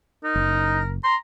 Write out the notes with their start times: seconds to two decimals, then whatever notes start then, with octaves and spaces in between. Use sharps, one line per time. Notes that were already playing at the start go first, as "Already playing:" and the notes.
0.24 D#4 A#4
0.36 F#1
1.04 A#5 C6